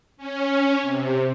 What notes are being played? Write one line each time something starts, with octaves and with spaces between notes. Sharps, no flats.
C#4
C3